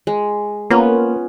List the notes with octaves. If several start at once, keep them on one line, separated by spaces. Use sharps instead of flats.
G#3
A#3 B3 C#4 F4